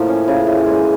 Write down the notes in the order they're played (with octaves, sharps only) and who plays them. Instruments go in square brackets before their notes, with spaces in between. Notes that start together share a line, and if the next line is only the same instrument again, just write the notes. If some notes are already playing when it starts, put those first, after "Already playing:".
Already playing: [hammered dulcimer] A2 F3 A#3
C#4
C#3
E3
G#3